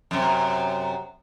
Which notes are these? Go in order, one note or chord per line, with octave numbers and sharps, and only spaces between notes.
F#2 C3